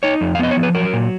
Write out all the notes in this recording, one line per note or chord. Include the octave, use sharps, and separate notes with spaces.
D#4 C#5
F2
F5
B3 D#5
C#5
F3
B4
F#3 A#4
A#2